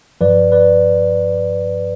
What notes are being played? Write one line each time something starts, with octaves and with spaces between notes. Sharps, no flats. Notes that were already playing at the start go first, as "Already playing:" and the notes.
G2 F3 B4 D5
B4 D5